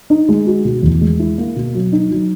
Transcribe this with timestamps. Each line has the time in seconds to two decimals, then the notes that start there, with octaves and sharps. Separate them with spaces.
0.10 D#4
0.29 G#3
0.46 F#4
0.65 B2
0.83 E2
1.01 G#3
1.19 E4
1.38 A#3
1.56 B2
1.75 F#3
1.92 D#4
2.11 F#3